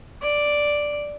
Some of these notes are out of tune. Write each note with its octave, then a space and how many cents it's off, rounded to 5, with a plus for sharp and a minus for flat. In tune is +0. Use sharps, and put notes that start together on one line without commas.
D5 +0